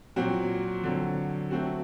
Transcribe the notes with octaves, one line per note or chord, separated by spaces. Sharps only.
A#2 F#3 C4 F#4
D3 F#3 C4
F#3 A3 C4 F#4